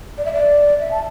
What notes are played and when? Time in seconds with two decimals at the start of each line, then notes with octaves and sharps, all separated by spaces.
0.18 D5
0.25 E5
0.33 D5
0.79 E5
0.91 A5